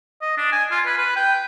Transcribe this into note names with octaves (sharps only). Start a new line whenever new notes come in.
D#5
D4
G#5
F4
B4
B4
G5